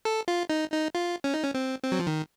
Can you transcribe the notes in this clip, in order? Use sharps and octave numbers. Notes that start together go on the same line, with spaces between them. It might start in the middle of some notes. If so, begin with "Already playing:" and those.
A4
F4
D#4
D#4
F4
C#4
D#4
C#4
C4
C4
F#3
F3
D#3